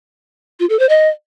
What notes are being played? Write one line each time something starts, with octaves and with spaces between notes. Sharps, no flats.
F4
A4
C5
D#5